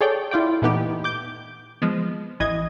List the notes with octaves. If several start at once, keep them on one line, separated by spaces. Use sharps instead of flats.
G#4 A4 C#5 D5 G5
E4 F4 D5 G5
A#2 E3 A3 B3 D#4 G4
D6 G6
F3 G#3 B3
A1 E3 D#5 G#6